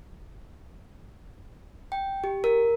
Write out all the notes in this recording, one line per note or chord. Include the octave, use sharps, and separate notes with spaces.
G5
G4
A#4